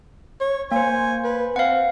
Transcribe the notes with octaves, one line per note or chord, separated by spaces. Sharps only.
C#5
A#3 C5 G#5
B4
C4 F5 F#5